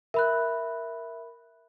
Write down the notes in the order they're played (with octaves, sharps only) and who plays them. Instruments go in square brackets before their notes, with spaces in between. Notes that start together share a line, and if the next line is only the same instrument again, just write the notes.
[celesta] A#4 B5 F#6 [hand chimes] E5